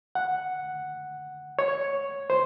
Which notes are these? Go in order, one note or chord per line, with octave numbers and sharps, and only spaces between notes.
F#5
C#5
C5